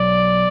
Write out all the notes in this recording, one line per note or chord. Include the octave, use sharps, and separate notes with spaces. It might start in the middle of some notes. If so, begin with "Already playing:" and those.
Already playing: B1 B2 F#3 D5